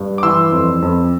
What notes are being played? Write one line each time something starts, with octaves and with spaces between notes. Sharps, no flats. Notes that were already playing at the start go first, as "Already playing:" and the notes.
Already playing: G2
D6
E3 C6 E6
F2
F2